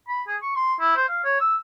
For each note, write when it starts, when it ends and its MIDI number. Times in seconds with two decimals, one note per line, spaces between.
0.09 0.22 83
0.28 0.37 68
0.43 0.54 85
0.56 0.74 84
0.81 0.96 64
0.97 1.06 72
1.09 1.20 77
1.25 1.40 73
1.41 1.56 88